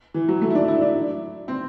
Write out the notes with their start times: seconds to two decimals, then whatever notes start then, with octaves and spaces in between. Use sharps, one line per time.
0.14 E3
0.28 F#3
0.41 A3
0.50 E4
0.55 D4
0.68 E4
0.81 D4
1.48 C4